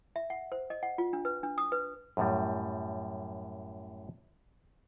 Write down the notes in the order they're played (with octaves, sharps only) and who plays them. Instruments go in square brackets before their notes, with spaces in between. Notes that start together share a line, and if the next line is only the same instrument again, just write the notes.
[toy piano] E5
F#5
C5
D#5
F#5
F4
D4
B4
D4
D#6
B4
[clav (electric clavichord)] F#2 A2 G3